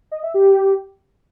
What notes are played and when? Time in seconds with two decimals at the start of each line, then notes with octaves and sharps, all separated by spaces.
0.11 D#5
0.23 E5
0.34 G4